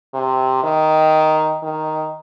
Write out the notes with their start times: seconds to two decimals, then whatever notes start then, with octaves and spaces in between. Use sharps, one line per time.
0.14 C3
0.63 D#3
1.63 D#3